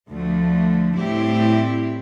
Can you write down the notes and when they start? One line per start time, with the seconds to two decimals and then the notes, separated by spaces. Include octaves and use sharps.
0.09 D2 D3 F3 A3
0.97 A2 G3 C4 E4 G4